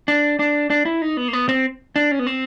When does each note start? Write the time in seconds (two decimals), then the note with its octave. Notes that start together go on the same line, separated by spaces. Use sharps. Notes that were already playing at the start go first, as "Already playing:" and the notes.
0.08 D4
0.39 D4
0.70 D4
0.85 E4
1.02 D#4
1.17 B3
1.28 A#3
1.33 B3
1.49 C4
1.96 D4
2.11 C#4
2.19 B3
2.27 C4